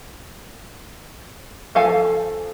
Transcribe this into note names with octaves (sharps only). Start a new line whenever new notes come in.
F3 A4 F5 G#5